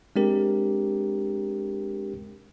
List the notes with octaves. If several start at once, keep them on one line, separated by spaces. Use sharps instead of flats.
G#3 C4 D4 G4 A#4